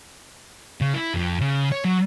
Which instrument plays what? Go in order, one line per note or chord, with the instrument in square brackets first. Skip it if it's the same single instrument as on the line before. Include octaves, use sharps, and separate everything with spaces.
[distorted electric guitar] C#3
E4
F2
C#3
C#5
F#3